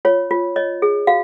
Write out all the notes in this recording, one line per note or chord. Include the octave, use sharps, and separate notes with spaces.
F4 C#5
F4
C#5 D#5
G#4
F#4 F5